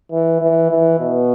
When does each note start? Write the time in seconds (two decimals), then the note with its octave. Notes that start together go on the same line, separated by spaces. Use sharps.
0.12 E3
0.42 E3
0.70 E3
1.00 B2